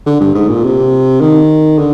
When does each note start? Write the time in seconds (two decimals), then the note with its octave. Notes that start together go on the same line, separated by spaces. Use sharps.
0.06 D3
0.21 G2
0.35 G#2
0.49 A#2
0.64 C3
1.21 D#3
1.78 D3